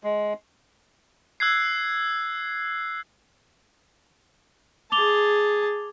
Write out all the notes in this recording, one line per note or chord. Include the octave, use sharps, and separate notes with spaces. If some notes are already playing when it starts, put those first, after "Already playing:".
G#3
E6 F#6 G#6 C7
G#4 A5 D6 F7 G7